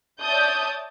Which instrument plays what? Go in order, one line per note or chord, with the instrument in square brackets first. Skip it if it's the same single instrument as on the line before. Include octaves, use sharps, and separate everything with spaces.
[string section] C#5 D5 E5 A5 D#6 G6